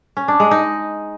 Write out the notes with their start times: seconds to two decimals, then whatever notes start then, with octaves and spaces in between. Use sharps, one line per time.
0.17 C#4
0.28 D4
0.40 G#3
0.51 D#4